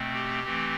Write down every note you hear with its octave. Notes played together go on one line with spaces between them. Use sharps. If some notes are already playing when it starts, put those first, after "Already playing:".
Already playing: B2 A3 C4
G4
E3 A3 C4